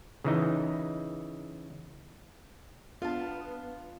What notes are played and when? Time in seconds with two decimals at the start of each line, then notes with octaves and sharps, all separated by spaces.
0.24 C#3 E3 D#4
3.02 B3 D4 F4 F5 A5